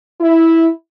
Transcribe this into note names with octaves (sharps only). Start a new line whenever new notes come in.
E4